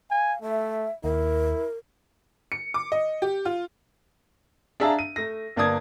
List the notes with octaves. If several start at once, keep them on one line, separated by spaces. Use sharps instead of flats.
F5 G#5
A3 E5
D#2 E4 A#4
C#7
D6
D#5
G4
F4
D4 G#4 E5 F5 A5 A#5
D#7
A3 A#6
G1 A#3 D5 A5 D#6 G#6